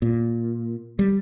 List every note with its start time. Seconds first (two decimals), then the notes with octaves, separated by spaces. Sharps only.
0.02 A#2
0.99 G3